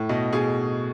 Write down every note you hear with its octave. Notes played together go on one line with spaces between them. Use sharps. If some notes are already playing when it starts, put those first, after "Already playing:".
Already playing: A2
B2 D#5
B2 G#4